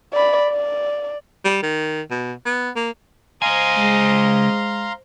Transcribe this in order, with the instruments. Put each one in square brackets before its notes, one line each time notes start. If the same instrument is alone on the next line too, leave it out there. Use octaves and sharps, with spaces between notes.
[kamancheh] D5 B5
D5
[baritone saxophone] G3
D#3
B2
B3
A#3
[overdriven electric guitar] C#2 G#5 [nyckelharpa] C5 D#5 [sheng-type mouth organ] F5 A#5 C6
[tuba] G#3